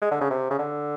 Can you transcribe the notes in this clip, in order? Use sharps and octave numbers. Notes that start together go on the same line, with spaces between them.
G#3
D3
C#3
C3
C#3
D3